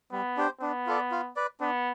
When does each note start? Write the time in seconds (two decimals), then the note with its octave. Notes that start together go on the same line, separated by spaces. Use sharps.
0.12 G3 B3
0.37 D4 G4 C5
0.61 B3 D4
0.87 F4 A4 D5
1.11 F4
1.36 B4 D5
1.60 B3 D4